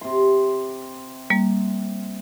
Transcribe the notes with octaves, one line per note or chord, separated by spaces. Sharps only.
C3 C6
G3 A#3